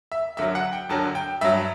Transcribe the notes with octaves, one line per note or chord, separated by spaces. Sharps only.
E5
F#2 D3 F#3 E5
F#5
G5
F#2 D3 F#3 A5
G5
G2 F#3 E5